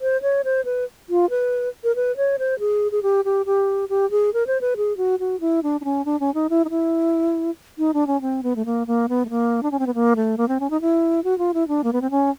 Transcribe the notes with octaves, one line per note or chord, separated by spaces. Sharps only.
C5
C#5
C5
B4
F4
B4
A#4
B4
C#5
C5
G#4
G#4
G4
G4
G4
G4
G#4
A#4
C5
B4
G#4
F#4
F#4
E4
D4
D4
C#4
D4
C#4
D#4
E4
D#4
E4
D#4
D4
C#4
C4
B3
A3
A#3
A#3
B3
A3
A#3
D4
C#4
C4
B3
A#3
A3
A#3
C4
C#4
D#4
E4
F#4
F4
E4
D4
A#3
B3
C4
C#4